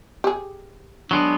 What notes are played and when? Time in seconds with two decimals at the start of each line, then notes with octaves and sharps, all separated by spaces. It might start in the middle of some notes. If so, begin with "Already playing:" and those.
0.24 G4 G#4
1.11 F#3 G#3 B3 D4